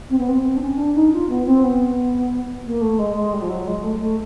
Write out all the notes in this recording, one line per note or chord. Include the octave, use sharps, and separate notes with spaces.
C4
B3
C4
D4
C#4
D4
D#4
F4
B3
C4
B3
A#3
A3
G#3
G#3
G3
F3
F#3
G#3
A3
A3